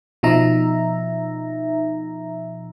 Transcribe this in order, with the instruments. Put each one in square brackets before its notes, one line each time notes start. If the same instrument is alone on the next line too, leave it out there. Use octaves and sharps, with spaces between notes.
[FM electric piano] B2 F3 D#4 E5 A#5